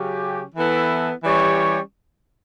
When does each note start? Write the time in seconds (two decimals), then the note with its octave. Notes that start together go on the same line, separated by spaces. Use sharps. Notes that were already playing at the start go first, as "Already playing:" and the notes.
Already playing: C#3 F#3 C#4 G4
0.55 E3 B3 E4 A4
1.23 E3 G3 C#4 G4 C#5